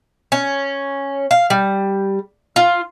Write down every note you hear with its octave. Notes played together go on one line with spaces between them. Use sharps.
C#4
F5
G3
F4